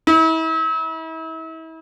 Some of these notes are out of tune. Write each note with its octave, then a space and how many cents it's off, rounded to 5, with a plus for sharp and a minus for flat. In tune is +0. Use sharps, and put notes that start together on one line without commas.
E4 -35